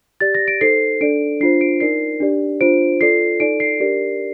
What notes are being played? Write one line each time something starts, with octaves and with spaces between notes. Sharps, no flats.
G4 D5 A6
A#6
D7
D#4 A4 C5 C7
D4 A4 D5 D7
D4 F4 C5 C7
D7
D#4 A#4 D5 C7
D4 G4 D5
D4 F4 C5 D7
F4 A4 D5 C7
D#4 A4 D5 D7
C7
D4 G4 A#4 D5